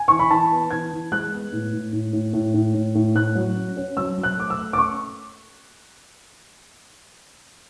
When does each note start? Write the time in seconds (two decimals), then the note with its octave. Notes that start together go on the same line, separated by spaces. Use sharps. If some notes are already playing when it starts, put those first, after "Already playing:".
Already playing: G#5
0.08 E3 C#6
0.19 B5
0.30 E3 A5
0.51 B3
0.71 E3 G#6
0.92 E3
1.12 G#3 F#6
1.32 B3
1.52 A2
1.73 A2
1.93 A2
2.13 A2
2.33 A2
2.54 A2
2.74 A2
2.95 A2
3.15 A2 F#6
3.35 F#3
3.56 C#4
3.77 C#4
3.97 F#3 E6
4.17 F#3
4.23 F#6
4.37 A3 D6
4.50 E6
4.57 A3
4.73 D6
4.78 C#4 C#6